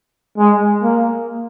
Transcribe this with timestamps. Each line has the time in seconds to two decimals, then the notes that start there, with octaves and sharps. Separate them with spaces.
0.38 G#3
0.83 A#3